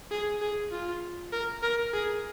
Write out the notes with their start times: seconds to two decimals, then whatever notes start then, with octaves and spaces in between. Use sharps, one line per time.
0.11 G#4
0.41 G#4
0.72 F4
1.33 A#4
1.63 A#4
1.93 G#4